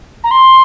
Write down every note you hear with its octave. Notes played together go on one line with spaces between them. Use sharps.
A#5
C6